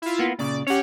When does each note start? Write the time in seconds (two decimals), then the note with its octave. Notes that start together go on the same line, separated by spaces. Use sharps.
0.02 E4 F4
0.19 A#3 B3
0.39 A#2 C#3 D5
0.67 C#4 G4 C#5 F#5